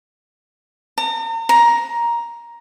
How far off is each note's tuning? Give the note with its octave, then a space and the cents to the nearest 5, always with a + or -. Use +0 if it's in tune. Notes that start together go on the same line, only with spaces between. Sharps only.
A#5 -40
A#5 +10